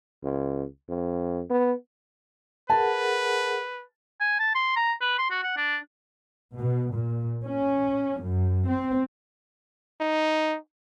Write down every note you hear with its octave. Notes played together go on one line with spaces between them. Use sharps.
C#2
F2
B3
G#4 A#4 B4 F#5 A5
G#5
A5
C6
A#5
B4
C6
F#4
F#5
D4
B2
A#2
C#4
F#2
C4
D#4